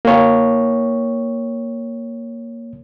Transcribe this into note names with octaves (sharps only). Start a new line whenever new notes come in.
A#3 C#5